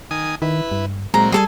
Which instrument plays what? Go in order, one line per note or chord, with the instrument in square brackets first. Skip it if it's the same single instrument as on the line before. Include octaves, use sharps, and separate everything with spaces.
[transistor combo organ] D#3 G#5 D#6
[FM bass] D#3 [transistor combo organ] E4 B4
[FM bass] G2
[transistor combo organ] A#2 F#3 C4 [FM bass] G#3 [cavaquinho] A#5
[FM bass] G3 [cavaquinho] G#4 A4 G#5